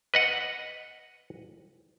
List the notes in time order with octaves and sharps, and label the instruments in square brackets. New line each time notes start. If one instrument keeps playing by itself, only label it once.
[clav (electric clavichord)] B4 D#5 F#5